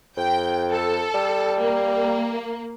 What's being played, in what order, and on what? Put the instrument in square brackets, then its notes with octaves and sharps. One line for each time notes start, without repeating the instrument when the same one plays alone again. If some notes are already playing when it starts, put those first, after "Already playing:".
[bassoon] F2 [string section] G5
[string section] A4
[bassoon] G3
[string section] A#3